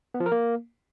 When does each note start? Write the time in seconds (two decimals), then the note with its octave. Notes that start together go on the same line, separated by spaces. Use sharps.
0.14 B3
0.20 F3
0.26 A#4
0.32 A#3